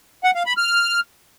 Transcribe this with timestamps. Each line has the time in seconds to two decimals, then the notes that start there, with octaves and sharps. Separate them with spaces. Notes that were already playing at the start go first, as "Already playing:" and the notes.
0.24 F#5
0.35 F5
0.46 B5
0.57 F6